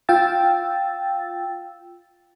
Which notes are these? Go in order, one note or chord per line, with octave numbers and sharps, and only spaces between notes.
F4 F5 G5 E6 A6